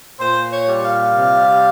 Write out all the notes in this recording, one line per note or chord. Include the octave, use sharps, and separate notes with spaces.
A#2 C5
C#5
G3
F5
C3